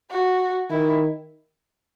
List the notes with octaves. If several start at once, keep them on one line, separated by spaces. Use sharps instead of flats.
F#4
D#3 E4